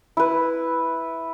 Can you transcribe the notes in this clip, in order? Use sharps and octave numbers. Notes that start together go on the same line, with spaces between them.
E4 B4